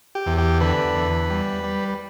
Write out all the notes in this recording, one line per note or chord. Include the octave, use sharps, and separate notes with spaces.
G4
E2
G4
D3 B4
E2
G3
G3